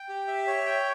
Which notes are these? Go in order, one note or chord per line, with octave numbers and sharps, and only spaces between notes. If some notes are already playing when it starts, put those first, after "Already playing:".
Already playing: G5
G4
E5
C#5
G5